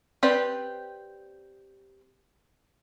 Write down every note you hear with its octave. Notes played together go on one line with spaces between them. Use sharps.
C4 G4 B4 D5